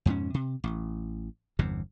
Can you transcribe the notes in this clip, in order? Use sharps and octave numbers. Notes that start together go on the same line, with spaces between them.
F2 G#2 B2 C#4
C3
A1
G1 E2 G2 C3